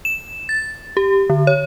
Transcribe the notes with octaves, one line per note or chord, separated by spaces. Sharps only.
E7
A6
G4
D3
C#5